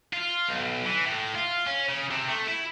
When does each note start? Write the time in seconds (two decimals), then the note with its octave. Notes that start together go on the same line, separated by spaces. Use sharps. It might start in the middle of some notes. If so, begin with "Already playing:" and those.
0.13 F4
0.49 B1
0.85 E3
1.05 A2
1.35 F4
1.67 C#4
1.89 C#3
2.11 C3
2.28 A3
2.48 E4